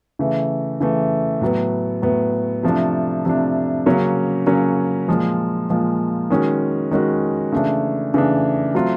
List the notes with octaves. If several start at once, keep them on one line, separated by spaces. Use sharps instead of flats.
C#3 E3 A3
C#3 E3 A3
A2 F#3 B3
A2 F#3 B3
C3 F3 A3 D4
C3 F3 A3 D4
C#3 F#3 A#3 C#4
C#3 F#3 A#3 C#4
A#2 F3 G#3
A#2 F3 G#3
D#3 G#3 C#4 F#4
D#3 G#3 C#4 F#4
C#3 E3 A3 D4
C#3 E3 A3 D4
F#3 A3 C4 F4